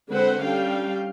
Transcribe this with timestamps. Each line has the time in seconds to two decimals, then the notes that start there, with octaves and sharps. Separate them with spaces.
0.11 D3 G#3 C4 B4 C5 F#5
0.43 G3 C#4 D4 F5 G5